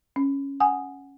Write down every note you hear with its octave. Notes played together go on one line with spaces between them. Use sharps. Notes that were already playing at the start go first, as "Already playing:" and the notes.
C#4
F#5 G#5 D#6